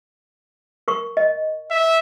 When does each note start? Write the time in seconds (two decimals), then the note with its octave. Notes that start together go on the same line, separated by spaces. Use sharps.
0.88 A#4 C#6
1.17 D#5
1.71 E5